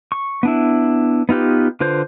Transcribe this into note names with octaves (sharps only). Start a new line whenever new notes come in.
C#6
B3 D4 E4
B3 D#4 F4 G4 B4
D3 F4 B4 C5